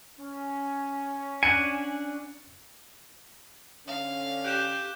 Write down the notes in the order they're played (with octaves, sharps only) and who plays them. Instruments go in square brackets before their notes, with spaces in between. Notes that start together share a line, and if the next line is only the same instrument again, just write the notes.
[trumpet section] C#4
[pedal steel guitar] D4 F#5 G#5 [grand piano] C#7 D#7
[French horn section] D3 C#4 [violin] F5
[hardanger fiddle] G4 [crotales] F#6 G6 E7